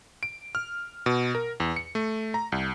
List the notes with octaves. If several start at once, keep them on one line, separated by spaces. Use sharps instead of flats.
D7
F6
B2
A#4
E2
C#7
A3
A#5
C2